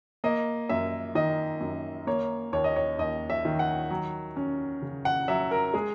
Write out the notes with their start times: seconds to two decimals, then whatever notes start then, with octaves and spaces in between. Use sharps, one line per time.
0.24 A#3 D#5
0.69 F#2 E5
1.15 D#3 D#5
1.61 F#2
2.07 A#3 C#5
2.53 D#2 C#5
2.64 D#5
2.76 C#5
2.99 D#2 D#5
3.30 E5
3.45 D#3
3.59 F#5
3.90 F#3
4.36 C#4
4.82 C#3
5.05 F#5
5.28 F#3 E5
5.51 A#4
5.74 G#3 G#4